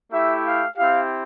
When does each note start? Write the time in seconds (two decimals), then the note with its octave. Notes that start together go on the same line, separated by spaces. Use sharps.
0.12 A3 E4 G4 E5
0.45 F5
0.77 C4 E4 G4 F5